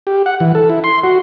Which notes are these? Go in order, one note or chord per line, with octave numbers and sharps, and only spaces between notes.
G4
F#5
E3
A4
E4
C6
F#4